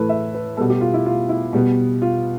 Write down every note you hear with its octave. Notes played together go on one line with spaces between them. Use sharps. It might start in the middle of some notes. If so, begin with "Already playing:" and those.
Already playing: A2 E3 A3 A4 B4
E5
B4
B2 G3 B3 A4
G4
F4
E4
F4
E4
B2 G3 B3
F4